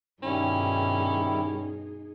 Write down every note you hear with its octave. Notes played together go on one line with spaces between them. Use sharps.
G2 B2 D#3 G3 C#4 D#4 E4 G#4